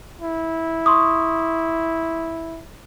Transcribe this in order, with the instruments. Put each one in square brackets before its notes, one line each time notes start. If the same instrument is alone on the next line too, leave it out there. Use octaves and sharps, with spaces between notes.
[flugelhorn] E4
[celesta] C6 C#6 D#6